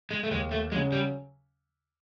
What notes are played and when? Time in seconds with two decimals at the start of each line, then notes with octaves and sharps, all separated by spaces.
0.11 G#3
0.23 A3
0.31 D#2 G#3
0.51 A3
0.72 C#3 F#3 G#3
0.92 G3